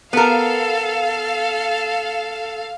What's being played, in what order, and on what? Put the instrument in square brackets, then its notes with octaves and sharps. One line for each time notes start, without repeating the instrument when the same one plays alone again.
[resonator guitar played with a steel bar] B3 A#4 [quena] A4 [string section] F5